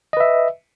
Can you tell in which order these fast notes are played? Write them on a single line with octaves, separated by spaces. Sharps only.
D#5 B4 E5